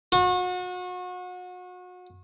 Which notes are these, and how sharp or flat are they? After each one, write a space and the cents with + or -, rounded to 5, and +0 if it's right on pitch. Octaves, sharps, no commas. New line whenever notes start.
F#4 -35